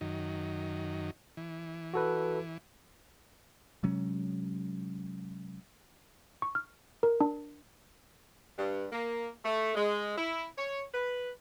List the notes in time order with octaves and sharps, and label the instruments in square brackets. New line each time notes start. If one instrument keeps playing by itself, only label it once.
[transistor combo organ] F#2 D#3
E3
[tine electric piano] F#4 A4 B4
[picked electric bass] C3 F#3 G#3 C#4
[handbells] C#6
F6
A#4
D4
[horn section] G2
A#3
A3
G#3
E4
C#5
B4